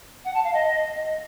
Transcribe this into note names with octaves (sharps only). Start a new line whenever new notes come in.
F#5
A5
F5
D#5